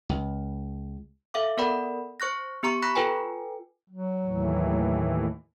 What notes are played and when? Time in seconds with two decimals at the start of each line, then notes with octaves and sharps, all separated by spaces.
0.09 C#2
1.34 A4 E5 F5 D6
1.57 B3 A4 A#4 D5 F#5 B5
2.20 C5 C#6 F#6 A#6
2.63 B3 G4 A#5 C#6
2.82 B5 C#6 F#6 A#6 B6
2.95 F4 A4 B4 G5 G#5
3.90 F#3
4.24 D#2 A2 E3